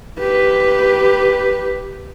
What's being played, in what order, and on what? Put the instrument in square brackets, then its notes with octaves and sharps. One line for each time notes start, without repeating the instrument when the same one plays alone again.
[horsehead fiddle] G4 B4